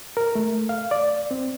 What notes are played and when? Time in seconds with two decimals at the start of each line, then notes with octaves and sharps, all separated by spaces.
0.17 A#4
0.35 A3
0.69 F5
0.91 D5
1.31 C4